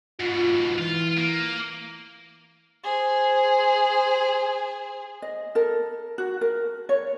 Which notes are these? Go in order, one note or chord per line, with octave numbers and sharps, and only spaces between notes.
G#2 B2 F4
E3 F4
A#3
G#4 C5
D#5
A4 A#4
F#4
A#4
C#5